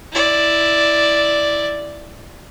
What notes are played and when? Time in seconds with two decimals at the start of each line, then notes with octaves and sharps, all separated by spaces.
0.13 E4 D5